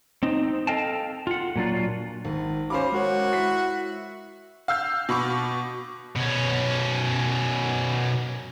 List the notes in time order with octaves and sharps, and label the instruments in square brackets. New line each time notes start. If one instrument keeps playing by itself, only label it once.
[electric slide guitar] C4 D#4
A4 D#5 F5 G5 A5
F4 F#5
A#2 F#3 D4 F4
[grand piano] G#1
[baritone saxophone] C#4 [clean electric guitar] F#4 B5 [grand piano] C5 F5 D6
[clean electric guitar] G#3 A#4 C#5 [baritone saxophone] F#4
[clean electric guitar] E4 [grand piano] B6
[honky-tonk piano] F5 E6 F6 G6
B2 B5 C#6 D6
[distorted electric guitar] B2 C#4